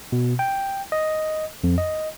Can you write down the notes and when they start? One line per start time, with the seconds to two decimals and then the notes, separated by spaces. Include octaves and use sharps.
0.12 B2
0.39 G5
0.92 D#5
1.64 F2
1.78 D#5